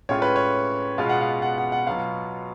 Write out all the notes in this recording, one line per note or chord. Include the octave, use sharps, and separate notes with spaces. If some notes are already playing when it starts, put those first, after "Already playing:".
A2 G#3 C#4 F4 C#5
B4
C#5
B2 G#3 B3 F4 F5
F#5
F5
F#5
F#5
F#5
B2 F#3 B3 F4 F5